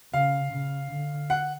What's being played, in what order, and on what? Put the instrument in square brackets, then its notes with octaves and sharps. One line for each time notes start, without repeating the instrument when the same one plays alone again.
[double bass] C#3 [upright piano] F5
[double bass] C#3
D3
[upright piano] F#5